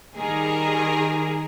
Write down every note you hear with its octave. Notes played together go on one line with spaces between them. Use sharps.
D#3 G3 G#4 A#4